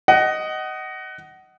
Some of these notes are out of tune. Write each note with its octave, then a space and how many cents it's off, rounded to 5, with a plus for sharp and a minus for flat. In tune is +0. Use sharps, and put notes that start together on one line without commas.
D#5 +0 F#5 +25